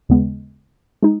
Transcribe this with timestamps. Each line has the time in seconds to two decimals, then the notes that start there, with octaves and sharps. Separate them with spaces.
0.09 D#2 C#3 G#3 B3
1.02 G#3 D#4